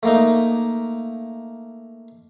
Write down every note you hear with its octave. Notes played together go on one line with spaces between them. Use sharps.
A3 A#3 D#4